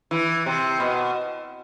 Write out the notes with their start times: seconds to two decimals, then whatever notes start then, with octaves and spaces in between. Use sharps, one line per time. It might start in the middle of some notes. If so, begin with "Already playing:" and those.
0.11 E3
0.46 C3
0.80 B2